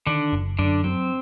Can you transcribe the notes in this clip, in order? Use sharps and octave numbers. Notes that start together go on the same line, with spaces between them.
D3 D#3 D4
F#1
F#2 D3 D4
F#3 C4